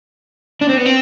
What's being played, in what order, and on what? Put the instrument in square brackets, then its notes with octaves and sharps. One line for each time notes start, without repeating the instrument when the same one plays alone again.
[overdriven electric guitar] D4
C4
B3
C4